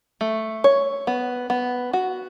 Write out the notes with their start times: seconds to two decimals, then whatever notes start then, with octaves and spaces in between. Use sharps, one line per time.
0.21 A3
0.64 C#5
1.07 B3
1.50 B3
1.93 F#4